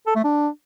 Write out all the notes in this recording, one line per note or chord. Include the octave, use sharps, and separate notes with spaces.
A4
A3
D4